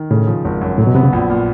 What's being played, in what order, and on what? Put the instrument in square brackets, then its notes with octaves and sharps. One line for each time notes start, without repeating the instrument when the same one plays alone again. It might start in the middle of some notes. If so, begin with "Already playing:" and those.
Already playing: [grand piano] D#3
[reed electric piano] A2 [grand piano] C#3
[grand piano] F3
G#1
F#2
[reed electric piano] A2 [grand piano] F#3
[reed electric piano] B2
[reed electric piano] C3 [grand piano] B3
[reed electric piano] C#3
[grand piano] A#1
A#2